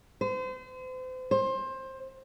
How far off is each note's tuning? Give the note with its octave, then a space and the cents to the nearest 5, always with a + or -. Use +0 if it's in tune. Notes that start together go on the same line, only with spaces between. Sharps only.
C5 -35
C5 +20